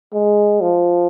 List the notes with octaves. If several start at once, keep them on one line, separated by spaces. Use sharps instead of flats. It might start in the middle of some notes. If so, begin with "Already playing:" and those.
G#3
F3